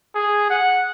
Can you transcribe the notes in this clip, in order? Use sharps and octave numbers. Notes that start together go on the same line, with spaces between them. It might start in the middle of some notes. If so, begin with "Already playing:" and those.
G#4
F#5